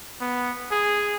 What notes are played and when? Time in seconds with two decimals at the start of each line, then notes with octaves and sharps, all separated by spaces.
0.21 B3
0.71 G#4